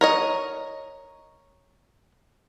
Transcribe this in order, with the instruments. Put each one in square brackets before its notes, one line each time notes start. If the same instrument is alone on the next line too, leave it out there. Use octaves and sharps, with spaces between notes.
[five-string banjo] A#4 C#5 D#5